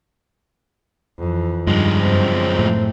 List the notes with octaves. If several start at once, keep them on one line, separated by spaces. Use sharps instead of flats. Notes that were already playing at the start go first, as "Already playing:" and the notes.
F2 E3
G2 D#3 F3 G#3
F#2 C4
A2